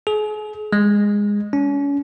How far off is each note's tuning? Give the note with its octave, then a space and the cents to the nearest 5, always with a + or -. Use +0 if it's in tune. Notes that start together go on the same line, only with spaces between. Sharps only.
G#4 +40
G#3 -15
C#4 +35